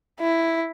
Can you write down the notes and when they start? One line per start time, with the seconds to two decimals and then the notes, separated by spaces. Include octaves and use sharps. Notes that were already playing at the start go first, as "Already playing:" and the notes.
0.20 E4